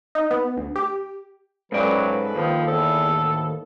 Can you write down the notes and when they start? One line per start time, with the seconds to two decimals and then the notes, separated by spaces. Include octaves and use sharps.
0.15 D#4
0.31 B3
0.57 D2
0.76 G4
1.72 G#2 F#3 A4 B4 D5
2.35 D#2 F3
2.67 E2 A4
3.11 D2 A2